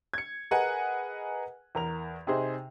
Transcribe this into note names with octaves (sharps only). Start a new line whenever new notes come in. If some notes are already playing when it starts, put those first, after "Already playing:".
G#6 C#7
G#4 A#4 B4 D#5 F#5 G#5
E2 A#4 F7
C3 D#4 G#4 C5